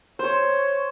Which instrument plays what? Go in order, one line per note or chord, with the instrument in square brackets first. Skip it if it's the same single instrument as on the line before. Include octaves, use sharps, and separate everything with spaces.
[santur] C5 [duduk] C#5